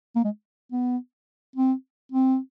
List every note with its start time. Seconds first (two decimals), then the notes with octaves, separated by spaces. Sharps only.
0.16 A#3
0.25 G#3
0.72 B3
1.56 C4
2.12 C4